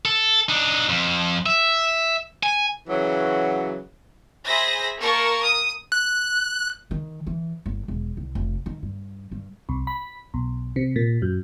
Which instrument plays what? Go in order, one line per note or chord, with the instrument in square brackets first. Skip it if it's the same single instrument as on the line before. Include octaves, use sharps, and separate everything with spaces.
[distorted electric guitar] A4
D4 D#4
F2
E5
G#5
[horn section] C#3 E3 F#3
[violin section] G#4 C5 E5 B5 A#6
A#3 A#4 A5 C#6
D#6
[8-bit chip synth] F#6
[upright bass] D#3
E3
G1
E1
C2
F1
D#3
G2
G2
[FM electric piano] C2
B5
B1
C3
A#2
F#2